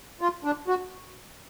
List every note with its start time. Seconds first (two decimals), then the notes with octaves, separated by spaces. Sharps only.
0.21 F4
0.44 D4
0.68 F#4